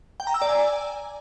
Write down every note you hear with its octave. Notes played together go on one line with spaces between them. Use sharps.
G5
A#5
E6
D5
G#5